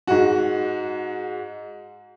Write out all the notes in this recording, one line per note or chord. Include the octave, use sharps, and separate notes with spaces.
G#2 F#4